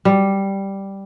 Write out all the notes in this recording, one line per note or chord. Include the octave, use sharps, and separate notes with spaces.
G3